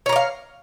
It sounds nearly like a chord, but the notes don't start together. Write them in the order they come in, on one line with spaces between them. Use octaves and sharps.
C#5 A#5 D5 F5